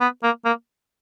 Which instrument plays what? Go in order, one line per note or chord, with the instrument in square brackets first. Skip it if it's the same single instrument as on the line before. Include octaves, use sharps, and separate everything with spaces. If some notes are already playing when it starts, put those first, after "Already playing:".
[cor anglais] B3
A#3
A#3